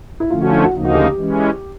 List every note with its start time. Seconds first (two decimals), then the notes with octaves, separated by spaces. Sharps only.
0.20 E4
0.30 D3 F3 A3 C#4 F4
0.42 F#4
0.52 E4
0.63 F#4
0.73 D2 C#3 F3 A#3 D#4
0.85 F#4
0.95 G4
1.16 E3 G#3 C#4